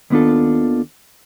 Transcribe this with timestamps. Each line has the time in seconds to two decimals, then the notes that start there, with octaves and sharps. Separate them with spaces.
0.10 D#2 D#3 B3 D4 F4 A4